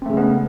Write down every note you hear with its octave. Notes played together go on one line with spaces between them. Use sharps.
C#3 G#3 A3 B3 C4